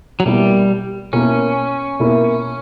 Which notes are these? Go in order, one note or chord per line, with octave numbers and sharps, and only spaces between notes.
F#3
B2 G3 A#3 E4 A#4
B2 A#3 C#4 E4 A#4
B2 A#3 E4 A#4